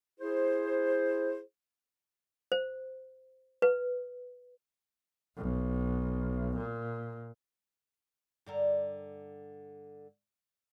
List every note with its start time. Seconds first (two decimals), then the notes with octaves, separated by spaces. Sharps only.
0.20 E4 G#4 C5
2.52 C5
3.62 B4
5.37 B1
6.57 A#2
8.46 G2 D3 A#4